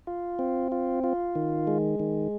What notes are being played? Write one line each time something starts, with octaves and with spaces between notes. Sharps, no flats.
F4
C4
F4
F4
D#3
G#3
D#3